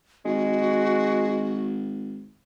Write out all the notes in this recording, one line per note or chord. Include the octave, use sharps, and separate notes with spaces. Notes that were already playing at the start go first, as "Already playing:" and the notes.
G#1 G#3 F#4